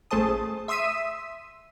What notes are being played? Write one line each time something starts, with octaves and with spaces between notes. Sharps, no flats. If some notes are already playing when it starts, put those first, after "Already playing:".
A1 A3 G#4 C5 A5 D#6
E5 C6 D#6 E6 B6 D#7